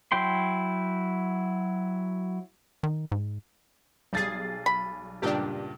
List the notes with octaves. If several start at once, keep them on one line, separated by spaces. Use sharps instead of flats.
F#3 E4 G5 C6
D#3
G#2
B1 G3 G#4 A6 C7
B5
C#2 G2 A#2 D4 G4